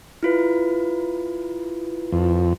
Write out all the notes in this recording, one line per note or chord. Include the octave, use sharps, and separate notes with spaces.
E4 F4 B4
F2